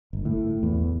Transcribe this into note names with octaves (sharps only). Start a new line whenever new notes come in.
G1
A2
E2